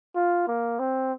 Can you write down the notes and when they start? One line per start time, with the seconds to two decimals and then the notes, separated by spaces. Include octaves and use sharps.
0.15 F4
0.48 A#3
0.79 C4